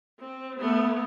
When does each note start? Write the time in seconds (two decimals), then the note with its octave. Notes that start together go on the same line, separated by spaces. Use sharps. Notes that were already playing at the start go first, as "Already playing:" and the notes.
0.20 C4
0.59 A3 B3